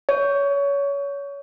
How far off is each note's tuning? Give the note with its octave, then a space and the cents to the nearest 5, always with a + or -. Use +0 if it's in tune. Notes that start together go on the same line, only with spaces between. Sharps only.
C#5 +25